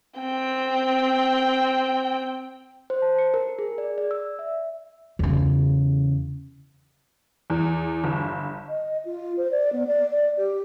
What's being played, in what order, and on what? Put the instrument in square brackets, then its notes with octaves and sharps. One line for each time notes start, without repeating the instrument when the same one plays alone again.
[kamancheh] C4 G5
[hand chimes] C5
A5
C#7
A#4
G#4
D5
D5
E6
E5
[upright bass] E2 C#3
[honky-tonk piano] E2
G1
[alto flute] D#5
F4
C5
D5
B3
D5
D5
G4